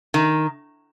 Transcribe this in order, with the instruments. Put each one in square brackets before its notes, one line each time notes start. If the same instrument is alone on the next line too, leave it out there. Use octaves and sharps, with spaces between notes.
[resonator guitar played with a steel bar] D#3